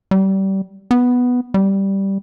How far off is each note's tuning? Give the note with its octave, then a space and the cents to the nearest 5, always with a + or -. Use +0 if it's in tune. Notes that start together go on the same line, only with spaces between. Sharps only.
G3 -25
B3 +0
G3 -5